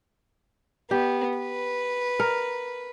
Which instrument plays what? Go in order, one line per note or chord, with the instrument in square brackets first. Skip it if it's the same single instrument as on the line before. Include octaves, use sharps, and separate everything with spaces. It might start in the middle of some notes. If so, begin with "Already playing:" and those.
[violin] B3 [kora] G4
[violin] B4
[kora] A#4